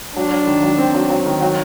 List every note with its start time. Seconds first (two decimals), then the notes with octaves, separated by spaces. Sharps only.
0.16 F#3 D4
0.31 F#3
0.47 D#3
0.63 F#3
0.78 C4
0.94 F#3
1.10 F#3
1.26 D#3
1.41 F#3